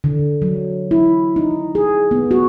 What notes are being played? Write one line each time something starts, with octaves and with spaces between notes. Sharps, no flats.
D3
F#3
E4
D#4
G#4
B3
F#4